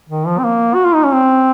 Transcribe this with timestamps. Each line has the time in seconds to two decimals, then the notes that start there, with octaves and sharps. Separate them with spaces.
0.09 D#3
0.27 F3
0.38 C4
0.44 A#3
0.75 F#4
0.84 F4
0.94 D#4
1.04 C#4
1.13 C4